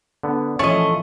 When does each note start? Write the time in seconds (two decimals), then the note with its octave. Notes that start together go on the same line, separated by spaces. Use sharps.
0.23 D3 B3
0.59 A#2 E3 F3 A3 C#4 C#5 D#5